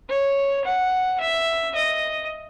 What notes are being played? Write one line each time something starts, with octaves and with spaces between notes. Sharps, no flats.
C#5
F#5
E5
D#5